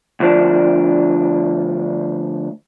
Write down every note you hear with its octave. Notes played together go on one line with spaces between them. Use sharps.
D2 F3 D4